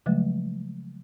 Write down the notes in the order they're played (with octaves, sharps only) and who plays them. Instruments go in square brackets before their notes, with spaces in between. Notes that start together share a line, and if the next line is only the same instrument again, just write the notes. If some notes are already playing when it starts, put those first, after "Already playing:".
[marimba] C#3 F3 F#3 G#3 A3